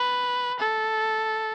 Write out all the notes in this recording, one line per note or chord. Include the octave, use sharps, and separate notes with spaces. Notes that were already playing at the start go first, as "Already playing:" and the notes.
Already playing: B4
A4